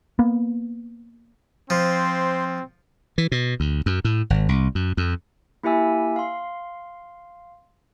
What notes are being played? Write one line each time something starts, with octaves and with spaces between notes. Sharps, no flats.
A#3 B3
F3 C4 C5
E3
B2
D2
F#2
A2
G#1
C2
F#2
F2
A#3 E4 G4 E5 G#5 E6
F5 C6